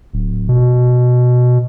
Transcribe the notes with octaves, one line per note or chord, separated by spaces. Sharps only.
D1
B2